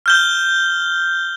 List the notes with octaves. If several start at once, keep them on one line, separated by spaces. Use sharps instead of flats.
F6 G6 G7